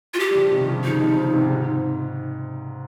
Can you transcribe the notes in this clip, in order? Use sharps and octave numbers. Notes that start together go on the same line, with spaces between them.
F4
G4
G3
C#3 F3
C3 D#3
C#3 F3
C#3 F3 D#4
F3 G#3
C#3 F3
G#2 C3
G#2